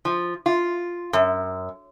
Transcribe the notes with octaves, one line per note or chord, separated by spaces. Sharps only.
F3
F4
F#2